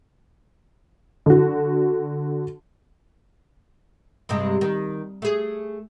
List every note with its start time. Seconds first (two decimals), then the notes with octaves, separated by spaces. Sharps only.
1.26 D3 F#4
4.29 G2 C3 G#3
4.61 D#3
5.22 A3 G#4